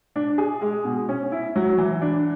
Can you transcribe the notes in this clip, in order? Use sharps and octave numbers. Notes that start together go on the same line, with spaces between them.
D4
G#4
G#3
B2
C#4
E4
F#3
E3
D4